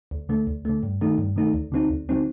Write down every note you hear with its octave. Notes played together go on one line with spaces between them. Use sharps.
D2
D3 A3
D2
D3 A3
G2
D#3 A3 D#4
G2
D#3 A3 D#4
D2
D3 F#3 C4 D#4
D2
D3 F#3 C4 D#4